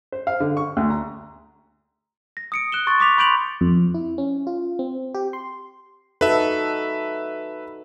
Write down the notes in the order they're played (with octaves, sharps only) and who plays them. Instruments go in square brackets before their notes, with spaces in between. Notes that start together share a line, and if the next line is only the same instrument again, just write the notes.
[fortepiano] C5
F5
D3
C#6
D2
A#5
[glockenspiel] A#6
D#6 C#7 D7
F#6 E7 G7
C6 C#6 A6
D6 B6 F7
B5 C6 G6 D7 F7 F#7
[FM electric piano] F2
E4
C#4
F4
C4
G4
C6
[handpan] D#4 F#4 A4 [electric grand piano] B4 E5